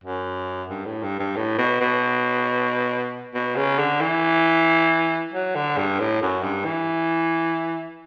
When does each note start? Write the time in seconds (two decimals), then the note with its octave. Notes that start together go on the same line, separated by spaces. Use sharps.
0.04 F#2
0.70 G2
0.86 A2
1.03 G2
1.19 G2
1.36 A2
1.58 B2
1.81 B2
3.35 B2
3.56 C#3
3.78 D3
4.01 E3
5.34 F#3
5.55 D3
5.78 G2
6.00 A2
6.22 F#2
6.44 G2
6.65 E3